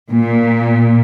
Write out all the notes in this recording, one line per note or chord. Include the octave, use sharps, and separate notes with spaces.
A#2